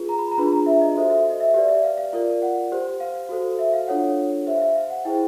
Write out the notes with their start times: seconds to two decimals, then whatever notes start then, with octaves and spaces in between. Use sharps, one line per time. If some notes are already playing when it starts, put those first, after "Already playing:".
Already playing: F4 G#4 B4
0.09 A#5
0.19 B5
0.31 A#5
0.38 D4 F4 G#4 B4 B5
0.53 A#5
0.66 E5
0.82 D#5
0.96 F#4 A4 C5 E5
1.10 E5
1.30 D#5
1.40 E5
1.54 G4 B4 D5 E5
1.68 E5
1.83 F5
1.98 F5
2.13 F4 A#4 D5
2.42 F#5
2.72 G4 C5
3.00 F5
3.29 F#4 A4 C5
3.59 E5
3.74 F5
3.87 D4 F4 A4 C#5 F#5
4.46 G4 C5 E5
4.57 F5
4.62 E5
4.75 F5
4.90 F#5
5.05 E4 G#4 C5 G5